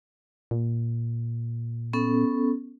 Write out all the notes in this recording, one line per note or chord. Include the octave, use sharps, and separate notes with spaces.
A#2
B3 C#4 A4